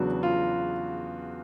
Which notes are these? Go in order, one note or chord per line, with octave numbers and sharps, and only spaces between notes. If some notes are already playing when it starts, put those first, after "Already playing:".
Already playing: E2 C#3 F#3 B3 D4 F#4
F4